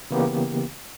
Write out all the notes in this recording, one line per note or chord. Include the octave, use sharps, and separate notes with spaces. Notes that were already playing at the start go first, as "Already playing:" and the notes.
C#3 E3 A#3 B3 G4